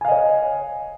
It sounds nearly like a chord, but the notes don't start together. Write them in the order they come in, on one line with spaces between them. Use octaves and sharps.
G#5 F5 D#5 C#5